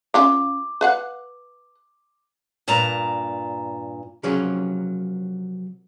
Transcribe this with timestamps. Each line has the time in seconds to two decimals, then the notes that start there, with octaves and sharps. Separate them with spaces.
0.14 C#4 F4 F5 D6
0.81 B4 F5 F#5
2.68 G2 A#2 A5 A#5
4.23 C3 F3 F#3 A#3 C#4 G#4